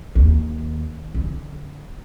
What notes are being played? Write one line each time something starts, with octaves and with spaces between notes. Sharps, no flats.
D#2
D3